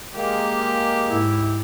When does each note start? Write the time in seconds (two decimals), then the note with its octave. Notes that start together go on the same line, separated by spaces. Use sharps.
0.16 G#3 A#3 G4
1.06 G#2 E4